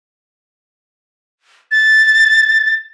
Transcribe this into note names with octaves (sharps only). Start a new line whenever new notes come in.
A6